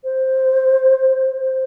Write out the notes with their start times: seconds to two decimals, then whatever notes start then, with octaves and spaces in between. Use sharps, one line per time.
0.04 C5
1.39 C5